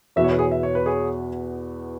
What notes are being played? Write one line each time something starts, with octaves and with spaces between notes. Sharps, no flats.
E2 B2 B3 F#4 E5
C#5
B4
G#4 C#5
E5
C#5
B4
G#4 C#5